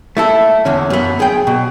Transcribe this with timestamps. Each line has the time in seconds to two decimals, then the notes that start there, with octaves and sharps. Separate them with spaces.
0.17 A3 E4 A4
0.65 E2 D3 C#4
0.90 F#2 B3
1.20 G#4 G5
1.47 B2